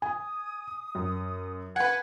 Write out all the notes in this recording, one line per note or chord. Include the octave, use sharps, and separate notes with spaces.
G#5 D#6
F#2
B4 F#5 G#5